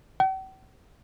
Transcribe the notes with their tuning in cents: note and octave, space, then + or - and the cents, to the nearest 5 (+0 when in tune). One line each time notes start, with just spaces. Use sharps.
G5 -45